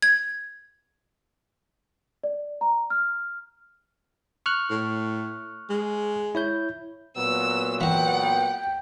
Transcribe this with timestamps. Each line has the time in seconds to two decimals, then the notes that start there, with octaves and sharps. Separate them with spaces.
0.02 G#6
2.24 D5
2.61 A#5
2.90 F6
4.46 C#6 F6 F#6
4.70 A2
5.70 G#3
6.35 E4 C#5 G6
7.17 A#2 F#3 B3 E6
7.81 E3 F#4 F#5 G5